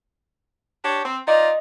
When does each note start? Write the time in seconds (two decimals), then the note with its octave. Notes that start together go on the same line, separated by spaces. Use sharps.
0.85 D4 G4 C#5
1.05 C4
1.28 D#4 F4 D5 D#5